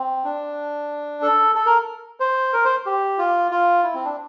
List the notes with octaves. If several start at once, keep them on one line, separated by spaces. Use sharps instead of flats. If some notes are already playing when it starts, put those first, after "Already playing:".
Already playing: C4
D4
A4
A4
A#4
C5
A#4
C5
G4
F4
F4
E4
C4
D4